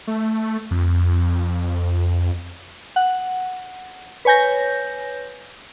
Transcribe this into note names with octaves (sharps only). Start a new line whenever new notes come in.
A3
F2
F#5
B4 C#5 G#5 G6 A#6